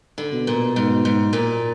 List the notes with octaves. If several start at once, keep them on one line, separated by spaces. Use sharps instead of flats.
D3
B2
A#2
G#2
G#2
A#2